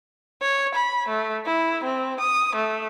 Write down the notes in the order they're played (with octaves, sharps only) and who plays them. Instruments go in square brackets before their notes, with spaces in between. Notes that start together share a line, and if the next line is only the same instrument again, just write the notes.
[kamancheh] C#5
B5
A3
E4
C4
D#6
A3